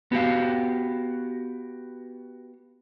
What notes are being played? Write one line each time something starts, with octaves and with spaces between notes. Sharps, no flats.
B3 F#4 G4 F5